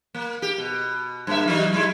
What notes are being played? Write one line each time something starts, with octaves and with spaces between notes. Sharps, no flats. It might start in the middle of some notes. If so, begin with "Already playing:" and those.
A#3
G4
B2
G2 A#3 E5
E3 F#3 D#4
F#3 G#3 E4